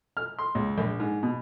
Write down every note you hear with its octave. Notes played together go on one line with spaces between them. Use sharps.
F6
C6
C#2
A#1
G#2
B2